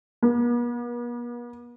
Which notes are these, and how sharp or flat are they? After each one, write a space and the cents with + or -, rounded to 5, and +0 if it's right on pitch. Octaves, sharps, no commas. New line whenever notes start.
B3 -45